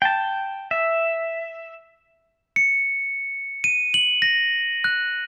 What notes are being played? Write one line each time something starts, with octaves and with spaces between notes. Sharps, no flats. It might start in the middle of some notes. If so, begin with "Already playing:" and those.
G5 A5
E5
C#7
D#7
F#7
A#6
F#6